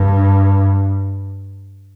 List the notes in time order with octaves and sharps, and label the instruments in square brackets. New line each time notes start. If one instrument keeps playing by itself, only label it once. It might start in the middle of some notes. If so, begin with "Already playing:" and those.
Already playing: [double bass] G2